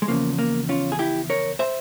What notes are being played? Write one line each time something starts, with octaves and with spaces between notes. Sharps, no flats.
G#3
E2 C#3 F3 A#3
A#3
C#4 F4
G#4
E4 G4
A#4 C#5
C5 E5